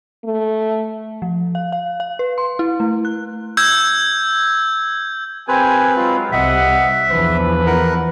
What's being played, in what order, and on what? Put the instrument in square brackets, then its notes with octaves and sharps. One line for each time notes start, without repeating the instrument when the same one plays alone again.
[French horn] A3
[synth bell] F3
F5
F5
F5
B4
C6
E4
A3
F#6
[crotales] E6 G6 G#6
[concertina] C4 B4 [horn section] G4 A#4 G#5
[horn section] F#3 G#3 F4
[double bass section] C2 [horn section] D#5 F#5 [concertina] E5
[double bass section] E2 E3 F3 [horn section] D4 B4
[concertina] A#4 F#5